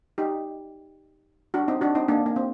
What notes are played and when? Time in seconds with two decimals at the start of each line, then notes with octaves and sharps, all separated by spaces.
0.18 D#4 G4
1.54 D4 F#4
1.68 C4 D#4
1.81 D4 F#4
1.95 C4 D#4
2.08 A#3 D4
2.26 A#3
2.36 C4